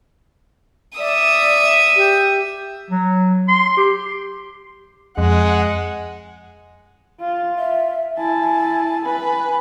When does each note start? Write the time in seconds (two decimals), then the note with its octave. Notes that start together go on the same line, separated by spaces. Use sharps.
0.98 D5 E5 D#6
1.96 G4
2.90 F#3
3.48 C6
3.77 G4
5.18 F2 G#3 F#5
7.20 F4
7.58 E5
8.17 E4 G#5 A5
9.05 B4 B5